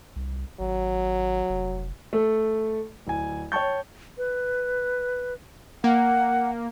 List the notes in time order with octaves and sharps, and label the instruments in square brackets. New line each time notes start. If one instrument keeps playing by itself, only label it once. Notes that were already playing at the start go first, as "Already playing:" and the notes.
[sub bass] C2
[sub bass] G#1 [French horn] F#3
[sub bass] F1
[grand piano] A3 A4
D1 G#5
C#5 G5 A5 C#6 G6
[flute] B4
[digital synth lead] A#3 [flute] F#5